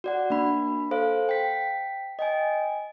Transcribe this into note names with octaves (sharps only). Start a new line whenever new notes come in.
F#4 D5 F#5
A#3 D4 B5
A4 C5 F5
G5 B6
D#5 G5 G#5